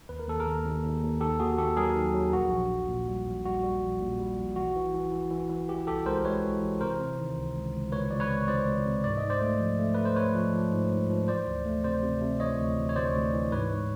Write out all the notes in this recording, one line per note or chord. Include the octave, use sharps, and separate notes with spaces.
D#2 B4
A#4
D#2 A4
G#4 A#4
D#2
D#2
D#2
D#2
D#3 G4 A4
D#2 F#4 G#4
D#2 G4 A4
F#3 G#4 A#4
D#3
F#3
A#1 F#4
A#1
A#1
A#2
G3
A#1
G3 F#4
G3
A#1
A#2
G3
A#1
E3 F#4
E3
E3
E3
E3
E3
E3 G4
C2 G4 A4
G#3 A#4 C5
G#3 B4 C#5
E3
E3
C3 A#4 C5
C3
D#3
C#2
C#2
C#2
C#2 B4 C#5
C#2 D5
B4 C#5
C#2
C#2 C5 D5
C#2
C3
G#2 D5
D#5
G#2
C5 D5
A3
F3
A3
A3 B4
C5
A3 B4 C#5
F3
F3
G#2
G#2
F3
E3 C5 D5
D2
A3
C3 C5 D5
C3
C3
E3 C#5 D#5
D2
D2
C#5
D2 C5 D5
D2
E3
G#2 B4 C#5
G#2